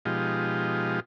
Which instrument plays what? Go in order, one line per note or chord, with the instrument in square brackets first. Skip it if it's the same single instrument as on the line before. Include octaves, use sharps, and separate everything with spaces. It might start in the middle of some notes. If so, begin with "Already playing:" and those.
[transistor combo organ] B2 F3 G#3 D#4 F4 G4